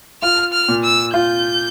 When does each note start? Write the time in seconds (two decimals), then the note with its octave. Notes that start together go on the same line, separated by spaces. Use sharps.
0.22 F4 F6
0.53 F6
0.68 A#2
0.84 E6
1.14 F4 G6